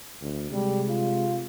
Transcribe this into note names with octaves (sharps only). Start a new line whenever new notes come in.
D2
C3 G3 G#3
F4